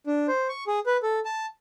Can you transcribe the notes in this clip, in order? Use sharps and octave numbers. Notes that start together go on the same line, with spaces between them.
D4
C5
C#6
G#4
B4
A4
A5